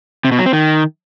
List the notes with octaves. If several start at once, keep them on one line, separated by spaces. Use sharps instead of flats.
C3
B2
F#3
C4
D#3